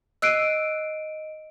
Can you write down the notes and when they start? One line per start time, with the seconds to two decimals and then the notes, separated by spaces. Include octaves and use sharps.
0.22 D#5 E6 F#6 C7 D7 D#7